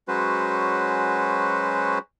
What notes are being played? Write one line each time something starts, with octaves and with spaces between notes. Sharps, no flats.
F#3 G#3 C#4 F#4 B4 C5